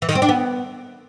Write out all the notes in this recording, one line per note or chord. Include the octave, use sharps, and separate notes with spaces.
E3
D#3
C4
D4
B3